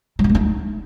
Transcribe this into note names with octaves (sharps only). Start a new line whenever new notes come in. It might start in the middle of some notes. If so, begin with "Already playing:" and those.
G3
B3
A3
D#4